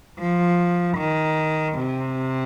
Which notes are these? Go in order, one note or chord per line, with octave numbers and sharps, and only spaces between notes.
F3
D#3
C3